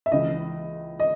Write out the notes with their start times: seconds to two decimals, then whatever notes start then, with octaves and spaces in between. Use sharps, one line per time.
0.06 E5
0.12 C#2 C#3 E3 D#5
1.00 D#5